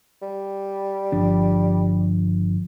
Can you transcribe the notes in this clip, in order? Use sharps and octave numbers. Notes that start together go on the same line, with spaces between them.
G3
G1 F3 D4